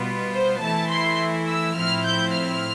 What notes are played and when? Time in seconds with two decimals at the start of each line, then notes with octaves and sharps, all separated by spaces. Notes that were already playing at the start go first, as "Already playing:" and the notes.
Already playing: B2 G3 B3 F4
0.33 C5
0.62 E3 A3 E4 A5
0.90 C6
1.48 E6
1.76 A2 F3 C4 E4 F6
2.06 G6
2.33 F6